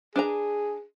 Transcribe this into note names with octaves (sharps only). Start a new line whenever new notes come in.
D4 G#4 B4 A#5